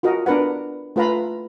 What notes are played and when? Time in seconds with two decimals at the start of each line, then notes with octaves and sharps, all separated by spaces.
0.03 F4 F#4 A#4 D#5
0.26 B3 D4 A#4 B4 F#5
0.96 A3 F4 B4 F5 A#5 B5